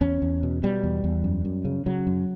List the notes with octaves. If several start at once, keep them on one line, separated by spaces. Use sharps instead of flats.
E2 C#4
E2
B2
B2 G3
E2
E2
F#2
F#2
C#3
C#3 F#3
F#2